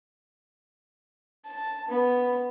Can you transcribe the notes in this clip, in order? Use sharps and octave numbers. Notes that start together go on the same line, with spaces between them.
A5
B3